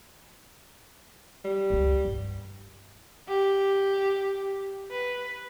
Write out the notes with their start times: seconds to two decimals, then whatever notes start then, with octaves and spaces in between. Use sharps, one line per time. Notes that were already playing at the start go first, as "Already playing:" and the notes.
1.45 G3
1.70 C#2 F#2
2.05 G2 B3
3.28 G4
4.91 B4